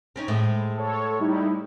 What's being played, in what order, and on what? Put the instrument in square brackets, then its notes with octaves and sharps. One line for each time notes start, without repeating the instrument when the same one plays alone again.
[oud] C4 C#4 D#4
A2 G#3
[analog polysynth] A4 C#5
G3 D#4 E4